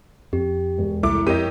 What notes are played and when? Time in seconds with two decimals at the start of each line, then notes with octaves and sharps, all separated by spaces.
0.33 F2 G4
0.78 E1
1.03 C2 A3 E4 D6
1.27 F2 G4 A#4 C#5 D#5 D#7